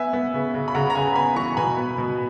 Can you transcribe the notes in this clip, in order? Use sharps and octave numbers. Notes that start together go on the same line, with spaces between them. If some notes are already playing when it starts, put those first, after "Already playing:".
Already playing: B3 E5 G#5
B3
C#3
C#3
B5
C#3 F#5 A#5
A#5
C#3 G#5 B5
B3 G#5 B5
E3 A#5 C#6
B2 G#5 B5
B3
B2